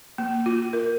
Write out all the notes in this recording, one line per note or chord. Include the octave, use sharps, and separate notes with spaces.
A#3
F4
A#4